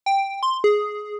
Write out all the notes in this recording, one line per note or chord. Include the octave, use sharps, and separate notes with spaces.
G5
C6
G#4